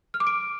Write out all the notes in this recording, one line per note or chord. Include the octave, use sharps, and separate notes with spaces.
F6
D6
D7